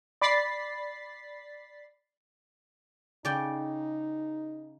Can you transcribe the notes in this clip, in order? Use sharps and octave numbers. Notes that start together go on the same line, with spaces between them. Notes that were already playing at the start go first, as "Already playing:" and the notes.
D5 B5 A6 B6 C7
C#3 D#4 D5 G5